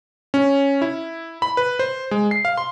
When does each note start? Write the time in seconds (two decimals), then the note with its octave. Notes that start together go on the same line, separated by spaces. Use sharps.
0.34 C#4
0.82 E4
1.42 B5
1.57 B4
1.79 C5
2.11 G#3
2.31 C7
2.45 F5
2.57 C6